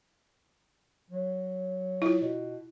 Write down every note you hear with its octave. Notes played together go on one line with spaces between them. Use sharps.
F#3
E4 F4
B2